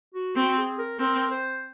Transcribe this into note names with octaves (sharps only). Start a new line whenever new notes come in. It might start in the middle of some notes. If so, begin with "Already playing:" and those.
F#4
C4 F#4
G#4
A#4
C4 A#4
C5